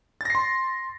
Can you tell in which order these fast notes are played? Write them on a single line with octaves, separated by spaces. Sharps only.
A6 A#6 C7 C6